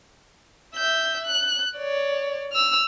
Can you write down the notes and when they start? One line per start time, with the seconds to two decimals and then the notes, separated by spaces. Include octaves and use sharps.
0.75 E5 G6
1.25 F#6
1.78 C#5 D5
2.53 E6 F6